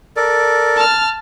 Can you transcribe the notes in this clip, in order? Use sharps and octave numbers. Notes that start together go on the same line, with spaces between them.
A4 A#4 D5
A5 F6